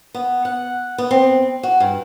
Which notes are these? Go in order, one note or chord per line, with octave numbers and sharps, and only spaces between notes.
B3
F#5
B3
C4
F#4
G2